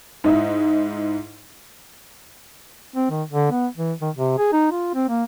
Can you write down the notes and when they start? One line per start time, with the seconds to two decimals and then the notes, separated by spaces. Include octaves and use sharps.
0.24 G#2 D#4 E4
2.95 C4
3.10 D#3
3.30 D3
3.51 B3
3.77 E3
4.01 D#3
4.15 C3
4.38 G#4
4.53 D#4
4.71 F4
4.94 C4
5.09 A#3